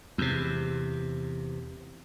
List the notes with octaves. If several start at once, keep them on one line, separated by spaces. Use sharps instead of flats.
E2 C3